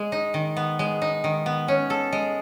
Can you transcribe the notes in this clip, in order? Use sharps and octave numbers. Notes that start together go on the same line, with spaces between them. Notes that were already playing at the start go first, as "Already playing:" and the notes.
Already playing: G#3
D#4
D#3
B3
G#3
D#4
D#3
B3
C#4
A4
G#3